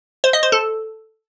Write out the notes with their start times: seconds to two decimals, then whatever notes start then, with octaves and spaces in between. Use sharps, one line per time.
0.24 C5
0.33 D#5
0.43 C5
0.52 A4